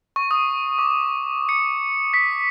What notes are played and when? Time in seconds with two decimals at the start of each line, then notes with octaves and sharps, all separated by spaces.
0.16 C#6
0.31 D#6
0.78 D6
1.49 C#7
2.14 B6